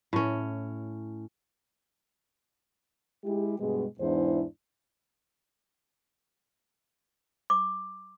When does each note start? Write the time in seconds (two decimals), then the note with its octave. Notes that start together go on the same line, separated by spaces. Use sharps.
0.13 A2 C#4
3.24 G#3 E4 G4
3.59 G2 B2 G#3
4.00 E2 G#2 D4 E4 C5
7.50 D6